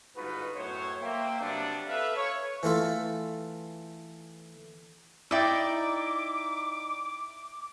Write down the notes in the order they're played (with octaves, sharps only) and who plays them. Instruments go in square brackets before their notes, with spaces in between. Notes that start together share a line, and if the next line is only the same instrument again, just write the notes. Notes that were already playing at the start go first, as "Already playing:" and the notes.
[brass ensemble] G1 G#2 D#4 F4 F#4 B4
F#2 A2 B3 C5 C#5
A#3 C5 E5 G5
C3 F#3 G3 B3 C4 D4
A4 B4 E5 F5
C#5
[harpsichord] E3 A3 F4 A4
[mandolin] D#4 D5 [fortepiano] E4 E5 G5 [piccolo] D6